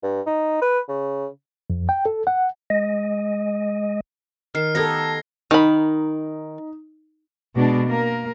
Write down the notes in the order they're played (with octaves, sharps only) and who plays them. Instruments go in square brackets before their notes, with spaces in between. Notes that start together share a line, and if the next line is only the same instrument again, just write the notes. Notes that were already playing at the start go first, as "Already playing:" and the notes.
[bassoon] G2
D#4
B4
C#3
[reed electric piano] F2
G5
A4
F#5
[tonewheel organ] G#3 D#5
[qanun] D#3 [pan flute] A#4 [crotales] F6 C7
[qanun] B3 D#4 G4 [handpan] A4 D#5 [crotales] G#6 A#6
[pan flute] A5
[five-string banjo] D#3 B5 [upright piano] D#4
[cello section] B2 G#3 D4
A#3 A#4